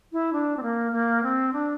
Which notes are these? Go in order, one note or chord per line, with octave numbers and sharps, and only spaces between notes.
E4
D4
C4
A#3
A#3
C4
D4